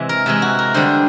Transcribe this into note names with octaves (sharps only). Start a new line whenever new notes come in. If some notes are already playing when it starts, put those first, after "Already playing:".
Already playing: C3 E3 G#3
A#4
C3 E3 G#3
F#4
A#4
D3 G3 C5